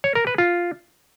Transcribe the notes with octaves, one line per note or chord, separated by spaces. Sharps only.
C#5
A#4
B4
F4